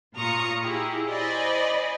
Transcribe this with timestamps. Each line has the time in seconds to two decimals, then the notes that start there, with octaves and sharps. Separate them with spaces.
0.15 A#2 F4 A#5 C#6 D#6 C#7
0.62 E4 G4 G#4
1.08 C5 D5 D#5 G#5 B5